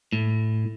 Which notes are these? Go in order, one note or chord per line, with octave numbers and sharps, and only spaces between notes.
A2